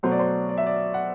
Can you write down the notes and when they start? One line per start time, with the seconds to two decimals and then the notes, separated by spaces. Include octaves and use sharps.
0.03 B2 F#3 A3 C5
0.12 D5
0.19 C5
0.49 D5
0.58 E5
0.67 D5
0.94 F#5